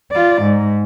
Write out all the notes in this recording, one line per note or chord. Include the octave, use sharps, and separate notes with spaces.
F4 D5
G#2